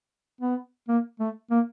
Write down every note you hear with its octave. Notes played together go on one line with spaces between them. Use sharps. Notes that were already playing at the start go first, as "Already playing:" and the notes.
B3
A#3
A3
A#3